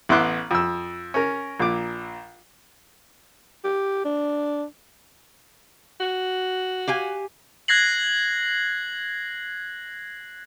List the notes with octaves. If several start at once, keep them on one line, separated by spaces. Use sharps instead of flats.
A1 B3 E5 C6 D6 F#6
F2 E6
C#4 A#4
A#1 A#2 D6
G4
D4
F#4
G4 F5 G#5
F#6 G#6 A#6 C7 F#7